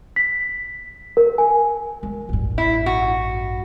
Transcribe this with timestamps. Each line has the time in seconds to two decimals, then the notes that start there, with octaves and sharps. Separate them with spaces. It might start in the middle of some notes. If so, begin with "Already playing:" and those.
0.16 B6
1.17 A#4
1.38 G#5
2.03 G#3
2.29 A1 G2
2.58 E4
2.86 F#4